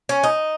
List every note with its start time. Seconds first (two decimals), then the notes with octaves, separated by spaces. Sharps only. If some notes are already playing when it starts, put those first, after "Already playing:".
0.09 C#4
0.24 D#4